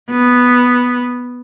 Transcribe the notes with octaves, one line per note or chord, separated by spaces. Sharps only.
B3